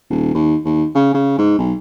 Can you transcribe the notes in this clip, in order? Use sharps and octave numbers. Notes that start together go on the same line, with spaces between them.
D#1
D#2
D#2
C#3
C#3
G#2
B1